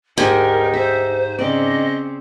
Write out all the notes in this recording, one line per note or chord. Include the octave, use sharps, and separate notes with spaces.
D2 G#2 D#4 G4 A#4
C5 E5
C#3 C4 D5 D#5